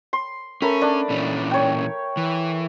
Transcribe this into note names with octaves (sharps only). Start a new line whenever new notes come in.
C6
A3 C#4 A#4 B5
D4 D5
A#2 E3 C#4
C#5 G5
E3